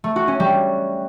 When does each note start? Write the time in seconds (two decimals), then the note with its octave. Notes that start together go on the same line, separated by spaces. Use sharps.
0.04 A3
0.16 F#4
0.28 C#4
0.40 G3